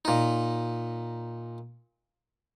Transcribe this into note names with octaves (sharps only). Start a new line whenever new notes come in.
A#2 D#4